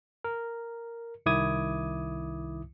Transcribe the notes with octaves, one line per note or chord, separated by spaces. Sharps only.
A#4
C2 D#3 E4 D6 D#6 G#6